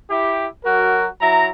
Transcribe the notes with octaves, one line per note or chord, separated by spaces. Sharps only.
E4 G4
F#3 F#4 A#4
F#3 E4 A#5